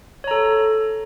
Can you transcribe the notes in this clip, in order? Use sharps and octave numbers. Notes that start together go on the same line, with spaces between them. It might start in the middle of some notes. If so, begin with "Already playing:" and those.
A4 C#5 A#5